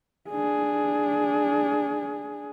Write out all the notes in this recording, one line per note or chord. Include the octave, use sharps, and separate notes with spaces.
D4 G#4